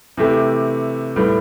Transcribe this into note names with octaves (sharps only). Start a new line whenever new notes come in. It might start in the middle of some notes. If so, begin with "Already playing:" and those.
C3 E3 A3 E4 G4
A2 G3 B3